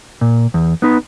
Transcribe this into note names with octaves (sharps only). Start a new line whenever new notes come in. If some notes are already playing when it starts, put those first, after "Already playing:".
A#2
E2
B3 D#4 B4